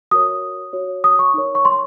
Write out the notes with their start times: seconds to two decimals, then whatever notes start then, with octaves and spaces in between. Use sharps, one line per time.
0.11 F#4 A#4 C#5 D#6
0.73 F#4 C#5
1.04 D#6
1.19 C#6
1.34 D#4 A#4 C#5
1.55 C#6
1.65 C6